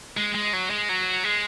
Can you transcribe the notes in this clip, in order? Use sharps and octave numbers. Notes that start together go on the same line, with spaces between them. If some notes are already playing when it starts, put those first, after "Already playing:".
G#3
G#3
F#3
G#3
F#3
G#3